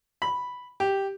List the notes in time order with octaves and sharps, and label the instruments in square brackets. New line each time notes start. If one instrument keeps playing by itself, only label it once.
[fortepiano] B5
G4